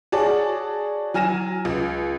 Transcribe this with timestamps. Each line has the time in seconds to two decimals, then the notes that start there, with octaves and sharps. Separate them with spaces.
0.12 F#4 G#4 C#5 D5 A5
1.14 F#3 G#5 F6 A#6 D#7 E7
1.65 C#2